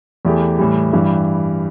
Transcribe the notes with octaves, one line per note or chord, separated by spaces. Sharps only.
E2 E3 A3 G4
A2 E3 G3
G2 E3 G3